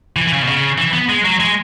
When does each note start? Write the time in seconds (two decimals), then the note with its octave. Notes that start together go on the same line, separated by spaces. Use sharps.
0.16 E3
0.28 E3
0.32 C#3
0.42 B2
0.47 C#3
0.78 E3
0.93 B3
1.09 G#3
1.24 F#3
1.40 G#3